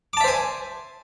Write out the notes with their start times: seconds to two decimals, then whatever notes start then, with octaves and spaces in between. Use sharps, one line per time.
0.13 D6
0.17 A5
0.21 E5
0.24 C5
0.28 G#5